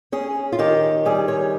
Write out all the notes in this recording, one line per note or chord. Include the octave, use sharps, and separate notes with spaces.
C#4 G#4
F4
D#3 G4
G3 G#4
C#5